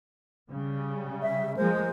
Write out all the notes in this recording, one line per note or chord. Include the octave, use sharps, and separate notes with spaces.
C#3 G3
E5
F3 G#3 A#3 C5